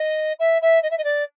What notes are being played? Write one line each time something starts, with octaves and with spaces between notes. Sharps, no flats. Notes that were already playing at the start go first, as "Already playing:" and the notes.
Already playing: D#5
E5
E5
D#5
E5
D#5
D5